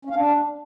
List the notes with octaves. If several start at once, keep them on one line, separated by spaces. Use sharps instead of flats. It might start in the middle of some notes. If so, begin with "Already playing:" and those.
C#4
F5
D4